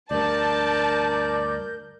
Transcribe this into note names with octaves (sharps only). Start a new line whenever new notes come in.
D2 G2 A#4 D5 A5 G6